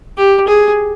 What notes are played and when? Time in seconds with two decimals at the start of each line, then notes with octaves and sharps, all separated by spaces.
0.17 G4
0.48 G#4